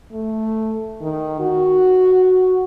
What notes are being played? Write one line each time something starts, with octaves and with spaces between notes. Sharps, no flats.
A3
D#3
F#4